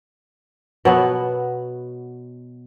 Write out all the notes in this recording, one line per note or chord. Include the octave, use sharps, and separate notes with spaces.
B2 F#3 B3